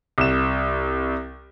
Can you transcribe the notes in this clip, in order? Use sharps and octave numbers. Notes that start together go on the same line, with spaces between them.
C2 E7